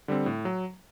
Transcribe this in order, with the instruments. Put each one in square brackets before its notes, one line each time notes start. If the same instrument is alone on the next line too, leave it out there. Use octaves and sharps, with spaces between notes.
[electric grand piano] D3 G3 C4
A2
F#3